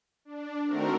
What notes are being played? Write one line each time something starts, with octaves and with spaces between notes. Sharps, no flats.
D4
D#3 A3 C4 F#4 A#4